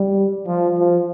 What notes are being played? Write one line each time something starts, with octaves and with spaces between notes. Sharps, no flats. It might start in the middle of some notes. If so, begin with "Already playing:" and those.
Already playing: G3
F3
F3